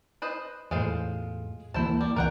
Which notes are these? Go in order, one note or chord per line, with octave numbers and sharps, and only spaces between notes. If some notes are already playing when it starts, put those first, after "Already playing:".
B4 C5 D#5
E2 A2 G#3 F4 C5
D2 E3 A#3 E4 C5 A5
G3
G1 C2 E3 A#4 F#5 G5